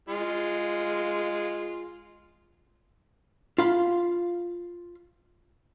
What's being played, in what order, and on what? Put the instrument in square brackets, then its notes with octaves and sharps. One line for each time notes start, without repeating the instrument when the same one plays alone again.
[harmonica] G#3 F4
[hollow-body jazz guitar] F4 F5 B5